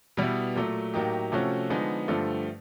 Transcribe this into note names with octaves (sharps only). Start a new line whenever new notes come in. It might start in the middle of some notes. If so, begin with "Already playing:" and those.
B2 G3 B3 E4
A#2 F#3 A3
A2 F#3 A#3 D#4 G4
C3 F3 A3 C#4 F#4
D3 F3 G#3 B3 D#4
G2 D3 F3 A3